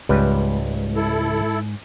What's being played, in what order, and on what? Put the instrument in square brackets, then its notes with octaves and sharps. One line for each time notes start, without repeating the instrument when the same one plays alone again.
[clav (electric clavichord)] C#2 G3 B4 [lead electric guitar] G#2
[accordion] E4 A4